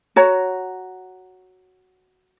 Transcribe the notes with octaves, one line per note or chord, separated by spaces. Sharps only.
F#4 C#5 A#5